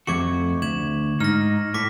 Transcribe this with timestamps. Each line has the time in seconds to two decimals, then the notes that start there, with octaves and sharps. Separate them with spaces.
0.07 F2 A3 F#4 C#6 D6 G#6
0.62 D2 G#6 E7 F#7
1.20 G#2 D#4 F6 A#6
1.74 A2 D6 A#6 B6